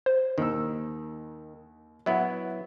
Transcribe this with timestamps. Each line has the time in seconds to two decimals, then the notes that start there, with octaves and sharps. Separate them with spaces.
0.06 C5
0.38 D#2 D#3 E6
2.06 F#3 B3 E4 E5 F#5